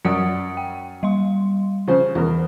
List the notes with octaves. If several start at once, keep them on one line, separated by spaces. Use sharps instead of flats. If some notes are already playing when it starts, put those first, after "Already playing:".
F#2 D5 F#5 D#6 C#7
G5
G3 F5 C6
C#3 F3 C5
E2 F4 A#4